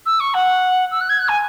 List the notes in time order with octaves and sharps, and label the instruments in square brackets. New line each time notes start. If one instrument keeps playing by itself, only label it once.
[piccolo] E6
C#6
F#5
E6
F#6
G#6
F#6
G#5